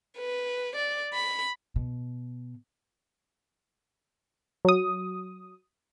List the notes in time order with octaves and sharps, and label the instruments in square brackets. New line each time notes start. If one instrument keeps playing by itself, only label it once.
[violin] B4
D5
B5
[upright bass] B2
[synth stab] F#3 D#6